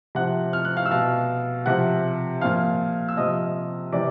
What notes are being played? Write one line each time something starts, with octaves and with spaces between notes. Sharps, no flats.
C3 F3 F#5 F#6
F6
F#6
F5 F6
E6
B2 F5 F6
C3 F3 F#5 F#6
A#2 F3 F5 F6
E6
C3 F3 D#5 D#6
C3 E3 D5 D6